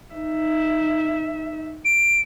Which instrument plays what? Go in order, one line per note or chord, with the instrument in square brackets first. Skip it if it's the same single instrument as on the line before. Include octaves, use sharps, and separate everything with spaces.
[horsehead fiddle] D#4 E5
[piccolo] D7